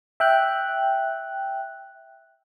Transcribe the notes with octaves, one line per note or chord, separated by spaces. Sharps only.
E5 G5 F#6